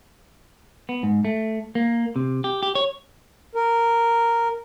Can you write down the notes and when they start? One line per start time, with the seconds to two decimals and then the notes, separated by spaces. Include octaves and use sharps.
0.89 B3
1.03 G#2
1.25 A3
1.75 A#3
2.16 C3
2.44 G4
2.63 G4
2.75 C#5
3.55 A#4